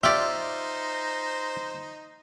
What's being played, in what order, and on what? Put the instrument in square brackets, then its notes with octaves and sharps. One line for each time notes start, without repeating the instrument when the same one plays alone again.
[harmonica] D#4 C5 [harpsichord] F4 [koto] G4 D5 [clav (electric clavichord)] E5